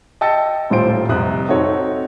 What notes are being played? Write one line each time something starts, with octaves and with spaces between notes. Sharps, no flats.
D#5 G5 A5 E6 A6 C#7
D#1 A2 F4 C5 D7
F1 C2 D#6 F#6
C4 D#4 F#4 A4 C#5